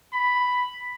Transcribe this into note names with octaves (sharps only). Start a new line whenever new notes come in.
B5